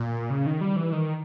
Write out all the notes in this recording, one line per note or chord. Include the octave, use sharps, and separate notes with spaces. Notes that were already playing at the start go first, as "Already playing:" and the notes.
Already playing: A#2
C#3
D#3
G3
E3
D#3